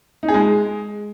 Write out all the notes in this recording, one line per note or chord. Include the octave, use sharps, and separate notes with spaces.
D#4
G#4
G#3